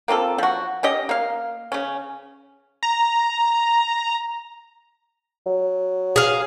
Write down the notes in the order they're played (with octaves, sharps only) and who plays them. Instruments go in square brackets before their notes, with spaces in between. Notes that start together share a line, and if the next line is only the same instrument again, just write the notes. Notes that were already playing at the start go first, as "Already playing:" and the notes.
[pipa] A#3 C4 F4 A4
F3 F#4
C#4 G4 D#5
A#3 F5
C#3 C#4
[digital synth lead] A#5
[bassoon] F#3
[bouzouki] G#4 F5